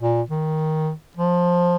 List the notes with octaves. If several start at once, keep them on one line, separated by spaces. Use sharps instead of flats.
A#2
D#3
F3